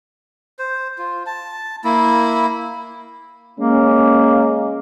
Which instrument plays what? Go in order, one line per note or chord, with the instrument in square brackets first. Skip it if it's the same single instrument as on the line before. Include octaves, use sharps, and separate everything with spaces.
[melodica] C5
F4
A5
A#3 E4
[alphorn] G#3 [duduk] A#3 [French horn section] C#4